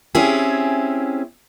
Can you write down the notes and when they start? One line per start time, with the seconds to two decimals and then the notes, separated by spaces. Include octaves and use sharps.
0.15 C4 C#4 E4 G4 G#4